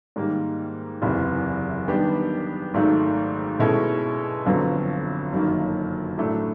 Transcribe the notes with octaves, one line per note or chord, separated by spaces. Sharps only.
G#2 D#3 G3 A#3
F#1 E2 C3 E3
D#3 G3 B3 D4 G4
G#1 G#2 D#3 F#3 A3
B2 G#3 C#4 E4 A4
G1 F2 D3 F#3 B3
G1 F#2 D#3 F#3 A#3
A2 F#3 A3 D4